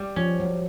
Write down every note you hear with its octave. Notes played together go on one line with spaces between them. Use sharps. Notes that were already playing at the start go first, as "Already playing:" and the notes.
Already playing: G3
F3 C#4
F#3